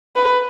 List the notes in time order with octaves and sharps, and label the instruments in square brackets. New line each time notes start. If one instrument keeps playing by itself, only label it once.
[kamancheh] B4